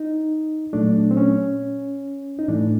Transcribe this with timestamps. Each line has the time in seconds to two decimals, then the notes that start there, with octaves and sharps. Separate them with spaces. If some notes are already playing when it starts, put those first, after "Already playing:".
Already playing: D#4
0.73 A#2 F#3 A3 D4
1.11 C4
1.17 C#4
2.39 D#4
2.48 A2 E3 A3 D4